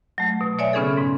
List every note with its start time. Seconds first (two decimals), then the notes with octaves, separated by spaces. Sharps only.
0.18 F#3 A3
0.41 B2
0.59 C#5 D5 E5 G#5
0.73 C#3 B3 C#4 D#4 G#4 A4
0.97 G#2